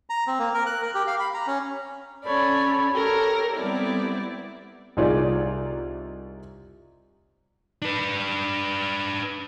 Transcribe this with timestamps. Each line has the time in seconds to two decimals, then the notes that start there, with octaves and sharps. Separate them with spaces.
0.10 A#5
0.27 C4
0.39 A#3
0.54 A#4
0.66 F#6
0.82 A#4
0.95 G4
1.07 F5
1.19 B5
1.34 A#5
1.47 C#4
2.24 C#4 A4 C#5 D5 B5
2.94 G4 A4 A#4 C#5
3.56 G3 B3 C4 E4 D5
4.97 C2 D#4 F4 G#4 D5
7.82 D4 B4